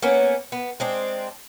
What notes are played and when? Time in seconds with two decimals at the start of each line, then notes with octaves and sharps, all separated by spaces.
0.02 A#3 B3 C#4
0.52 B3
0.80 G#3 C4 D4